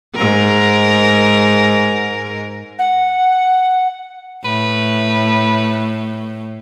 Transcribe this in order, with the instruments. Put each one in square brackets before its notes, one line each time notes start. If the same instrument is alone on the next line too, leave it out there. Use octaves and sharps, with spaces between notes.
[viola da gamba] G#2 A#4
[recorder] F#5
[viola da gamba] A2 [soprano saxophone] B4